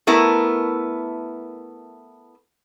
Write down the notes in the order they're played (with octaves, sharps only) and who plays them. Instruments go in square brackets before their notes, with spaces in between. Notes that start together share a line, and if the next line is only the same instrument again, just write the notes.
[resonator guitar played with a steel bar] A3 B3 E4 A#4